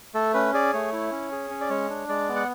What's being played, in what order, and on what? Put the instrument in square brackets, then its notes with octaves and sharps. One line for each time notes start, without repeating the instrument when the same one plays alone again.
[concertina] A3 A4
C#4 B4
G#4 D5
A3 C#5
E4
C#4
G#4
C#4
D5
G#3 C#5
D4
G#3 D5
B3
F#5